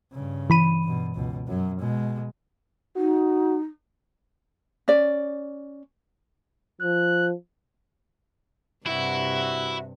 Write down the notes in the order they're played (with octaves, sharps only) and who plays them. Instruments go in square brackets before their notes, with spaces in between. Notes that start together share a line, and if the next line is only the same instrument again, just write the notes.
[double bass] G2 C#3
[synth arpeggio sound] E3 B5 D#7
[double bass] G2 B2
C#2 B2
F#2 F#3
B2 G#3
[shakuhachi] D#4 [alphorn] F#4
[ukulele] C#4 D5
[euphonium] F3 [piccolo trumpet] F#6
[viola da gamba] G2 C3 [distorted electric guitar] E4 [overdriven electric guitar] F#4 F#5 [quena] E5